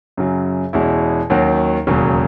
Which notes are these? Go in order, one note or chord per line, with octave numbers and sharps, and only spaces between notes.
F#2 C#3 F#3
E2 B2 G#3 C#4 E4
D#2 D#3 F#3 C#4 F#4
E1 D#2 C#3 F#3 C#4